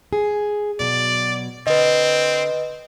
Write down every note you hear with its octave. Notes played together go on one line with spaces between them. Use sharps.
G#4
B2 F#3 D5
D3 C4 B4 D#5